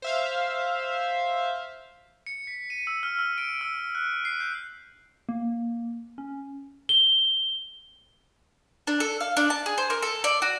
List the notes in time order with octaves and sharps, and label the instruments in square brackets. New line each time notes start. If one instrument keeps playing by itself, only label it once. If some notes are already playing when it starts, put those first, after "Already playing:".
[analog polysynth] C5 E5 F5
[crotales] C#7
B6
D#7
E6
F6
E6
D7
E6
F#6
C7
G6
[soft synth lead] A#3
C#4
[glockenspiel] G7
[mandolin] D4
A4
F5
D4
A5
G#4
C5
A#4
A4
D5
F#4